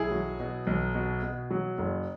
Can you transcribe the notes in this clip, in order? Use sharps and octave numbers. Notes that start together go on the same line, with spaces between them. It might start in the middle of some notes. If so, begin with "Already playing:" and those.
Already playing: B1 E4 G#4
F#3
B2
B1
B2
B2
F#3
F#1